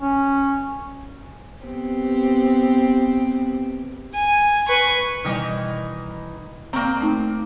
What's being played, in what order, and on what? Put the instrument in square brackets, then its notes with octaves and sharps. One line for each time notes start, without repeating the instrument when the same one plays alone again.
[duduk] C#4
[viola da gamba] B3 C4 G4
[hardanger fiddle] G#5
B4 C#6
[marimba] B2 G3 [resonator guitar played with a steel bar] D#3 E3 D#4
[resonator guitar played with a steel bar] A#3 C4 [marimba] A#5 C#6
[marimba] A3 D#4